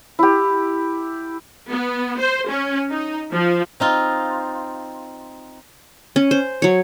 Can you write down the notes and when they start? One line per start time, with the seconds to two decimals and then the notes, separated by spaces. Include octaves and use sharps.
0.19 E4 G4
1.69 B3
2.18 C5
2.48 C#4
2.91 D#4
3.33 F3
3.80 C4 D#4 F4
6.16 C#4
6.31 C5
6.62 F#3 C#5